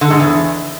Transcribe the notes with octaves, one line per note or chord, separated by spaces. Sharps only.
D3
G#2
E2